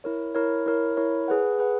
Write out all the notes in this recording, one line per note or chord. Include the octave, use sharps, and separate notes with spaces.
E4 A#4 C#5
E4 A#4 C#5
E4 A#4 C#5
E4 A#4 C#5
G#4 B4 F#5
G#4 B4 F#5